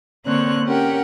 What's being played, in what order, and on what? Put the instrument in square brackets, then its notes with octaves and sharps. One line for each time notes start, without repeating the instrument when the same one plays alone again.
[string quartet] D3 A#3 C4 C#5 F#6
C#4 G4 A#4 F#5 G5